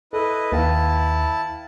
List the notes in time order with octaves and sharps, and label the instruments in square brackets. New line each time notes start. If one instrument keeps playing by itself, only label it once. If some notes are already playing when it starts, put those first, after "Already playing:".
[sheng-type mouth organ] E4 B4 D#5 [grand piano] A4
[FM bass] D#2 [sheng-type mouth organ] E4 A5 [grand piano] B4 F5 G5